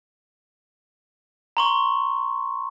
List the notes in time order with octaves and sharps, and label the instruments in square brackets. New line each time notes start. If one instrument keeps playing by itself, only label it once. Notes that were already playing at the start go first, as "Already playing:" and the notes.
[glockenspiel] A#5 C6 C#6